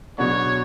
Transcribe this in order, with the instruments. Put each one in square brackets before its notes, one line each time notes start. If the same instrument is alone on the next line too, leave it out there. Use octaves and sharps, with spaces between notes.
[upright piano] B2 F#3 B3 D4 [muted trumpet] C#5